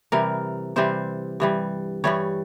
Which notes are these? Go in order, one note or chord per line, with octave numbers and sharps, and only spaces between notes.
C3 E3 G3 A#4
C3 E3 G3 C5
G2 E3 G3
G2 E3 G3 C#5